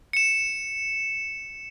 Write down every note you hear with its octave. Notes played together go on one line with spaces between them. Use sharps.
C#7 E7